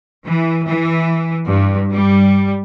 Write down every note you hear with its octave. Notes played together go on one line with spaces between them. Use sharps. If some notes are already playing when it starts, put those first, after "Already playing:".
E3
E3
G2
G3